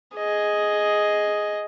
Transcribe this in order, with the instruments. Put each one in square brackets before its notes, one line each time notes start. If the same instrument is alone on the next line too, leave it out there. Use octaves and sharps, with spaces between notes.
[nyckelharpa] G#4 D#5